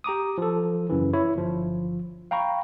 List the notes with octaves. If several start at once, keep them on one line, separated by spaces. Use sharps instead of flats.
G4 A#5 D6 D#6
F3 A4
F#2 C#3 E3
E4 C#5
G1 F3
F5 G5 A#5 B5 C#6